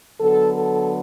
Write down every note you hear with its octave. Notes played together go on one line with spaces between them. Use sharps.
D3 F#3 B3 A4
A4